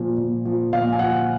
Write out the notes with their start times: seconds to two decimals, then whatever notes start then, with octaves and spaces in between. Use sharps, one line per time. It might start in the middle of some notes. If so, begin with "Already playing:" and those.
Already playing: A#2 F3
0.18 A#2
0.45 F3
0.73 A#2 F5
0.93 G#5
0.99 F3 F#5